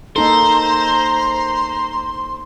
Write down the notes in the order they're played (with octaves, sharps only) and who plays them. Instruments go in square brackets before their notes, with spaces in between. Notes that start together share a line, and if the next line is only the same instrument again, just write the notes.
[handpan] A#3 D#4 A4 [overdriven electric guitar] C5 [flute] A#5 [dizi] C6